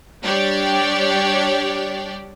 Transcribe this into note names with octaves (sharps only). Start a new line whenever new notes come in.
G3 D4 G4 C#5 D5 G5